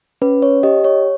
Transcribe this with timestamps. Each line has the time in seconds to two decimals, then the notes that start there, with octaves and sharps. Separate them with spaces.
0.22 C#4 B4
0.42 C#5
0.63 G4 D#5
0.84 C#5